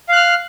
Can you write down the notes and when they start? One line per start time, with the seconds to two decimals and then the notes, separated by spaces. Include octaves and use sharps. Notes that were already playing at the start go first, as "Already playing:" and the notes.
0.09 F5
0.12 F#6
0.16 F6